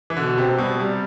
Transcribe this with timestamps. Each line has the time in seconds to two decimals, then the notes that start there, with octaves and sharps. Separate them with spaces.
0.10 E3
0.16 B2 D3
0.38 C3 C4
0.58 B2 G3
0.79 C3 G3